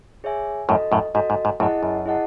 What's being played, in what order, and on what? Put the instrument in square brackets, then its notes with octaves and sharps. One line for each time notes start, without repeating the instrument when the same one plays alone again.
[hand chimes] G#4 C#5 E5 G#5
[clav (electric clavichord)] F#2 A2 [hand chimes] F#4 A4 D#5
[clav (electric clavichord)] F#2 A2
[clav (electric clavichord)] G#2 [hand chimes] F#4 A4 D#5
[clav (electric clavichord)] G#2
G#2
[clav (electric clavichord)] F#2 A2 [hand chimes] E4 G#4 D#5 F#5 A5
[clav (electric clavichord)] F#2
[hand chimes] E4 G#4 D#5 F#5 A5